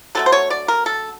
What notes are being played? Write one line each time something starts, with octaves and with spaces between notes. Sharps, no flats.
D3 F#3 A3 A4
C5
C#5
D5
A#4
A4